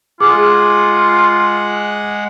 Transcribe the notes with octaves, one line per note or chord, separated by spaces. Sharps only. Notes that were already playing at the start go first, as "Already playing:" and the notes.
G#3 F4 G#4 F#5 D6